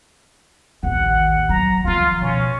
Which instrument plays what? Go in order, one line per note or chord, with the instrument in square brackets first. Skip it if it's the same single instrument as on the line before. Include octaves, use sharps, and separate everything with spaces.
[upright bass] A1 D#2 [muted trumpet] F#5
[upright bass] F#3 [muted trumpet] A#5
[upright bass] D#3 F3 [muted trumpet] F4
[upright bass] B2 [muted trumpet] C#4